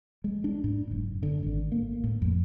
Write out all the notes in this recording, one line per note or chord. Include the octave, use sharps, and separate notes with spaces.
G#3
D4
G#2
F#1
D3
G#1
A#3
A2
F2